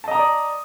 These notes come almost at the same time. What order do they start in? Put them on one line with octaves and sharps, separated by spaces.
A5 D#5 A#5 D#6 D5